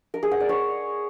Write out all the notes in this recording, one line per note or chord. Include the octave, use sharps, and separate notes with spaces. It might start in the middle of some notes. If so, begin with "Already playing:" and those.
A#4
G#4
F#5
D5
C#5